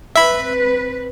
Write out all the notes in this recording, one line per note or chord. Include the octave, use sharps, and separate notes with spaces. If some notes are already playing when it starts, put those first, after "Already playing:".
C4 B4 E5 B5